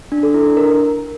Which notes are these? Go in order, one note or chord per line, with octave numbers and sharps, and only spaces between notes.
D4
A4
E4
D4
A#4